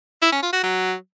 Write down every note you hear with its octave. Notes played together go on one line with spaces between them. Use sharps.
E4
C#4
F4
F#4
F#3